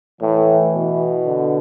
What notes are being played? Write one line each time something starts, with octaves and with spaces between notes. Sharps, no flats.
A2 E3
B2
D3